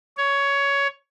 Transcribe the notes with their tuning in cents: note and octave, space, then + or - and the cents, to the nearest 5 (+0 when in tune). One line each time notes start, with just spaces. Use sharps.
C#5 +15